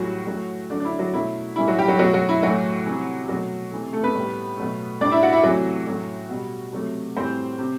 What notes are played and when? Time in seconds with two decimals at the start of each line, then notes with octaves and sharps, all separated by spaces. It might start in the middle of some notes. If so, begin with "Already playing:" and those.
Already playing: A2 E3 F#3 G3 F#4
0.27 A2 F#3 A3
0.70 D3 F#3 A3 D4
0.80 D4
0.85 E4
0.99 F#3 F#4
1.13 B2 F#3 A3 E4
1.56 A2 E3 G3 E4
1.67 F#3 F#4
1.78 G3 G4
1.88 F#3 F#4
1.99 B2 F#3 A3 F#4
2.14 F#3 F#4
2.29 E4
2.42 A2 E3 F#3 A3 F#4
2.86 C3 E3 G3
3.28 B2 F#3 A3 F#4
3.71 C3 E3 A3
3.93 A3 A4
4.03 B3 B4
4.15 A2 G3
4.57 B2 F#3 A3
5.01 A2 G3 D4 D5
5.11 E4 E5
5.22 F#4 F#5
5.33 E4 E5
5.43 C3 E3 F#3 A3 F#4
5.87 A2 F#3 A3
6.29 B2 G3
6.73 C3 F#3 A3
7.17 A2 E3 G3 C4 C5
7.59 C3